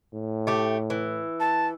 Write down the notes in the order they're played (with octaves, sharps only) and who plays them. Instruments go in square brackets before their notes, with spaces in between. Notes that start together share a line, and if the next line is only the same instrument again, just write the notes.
[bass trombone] A2
[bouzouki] A3 G4
E3
[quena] A5